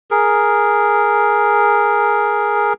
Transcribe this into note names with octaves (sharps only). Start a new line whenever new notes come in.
G#4 A#4